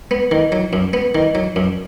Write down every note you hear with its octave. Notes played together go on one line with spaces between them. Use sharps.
B3
D#3
F#3
F#2
B3
D#3
F#3
F#2